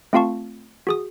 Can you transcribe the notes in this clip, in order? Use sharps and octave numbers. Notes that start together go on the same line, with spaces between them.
A3 C4 F4 F5 A5 C#6
F#4 G#4 D#6